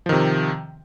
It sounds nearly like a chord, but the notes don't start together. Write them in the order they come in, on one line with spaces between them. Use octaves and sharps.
F3 D#3 C3